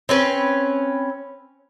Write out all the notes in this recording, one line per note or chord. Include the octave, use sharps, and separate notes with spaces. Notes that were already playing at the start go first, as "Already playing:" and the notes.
C4 C#4 B4